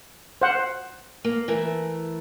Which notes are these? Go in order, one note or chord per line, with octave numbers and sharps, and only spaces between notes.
C5 F#5
A#3
E3 A3 A#4